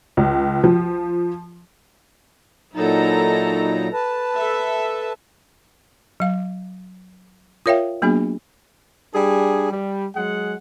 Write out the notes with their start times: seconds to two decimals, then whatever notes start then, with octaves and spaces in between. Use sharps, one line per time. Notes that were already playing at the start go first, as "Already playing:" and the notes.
0.17 C#2
0.64 F3
2.75 A#2 F#3 D#4 E4 A4 A#5
3.93 B4 A5
4.35 A4 E5
6.20 F#3 F5
7.66 F4 A#4 C#5 E5 F5 G5
8.02 F#3 A#3 B3 D4 F#4 G#4
9.13 G3 D4 G#4
9.70 G3
10.15 F#3 G#3 G#4 F#5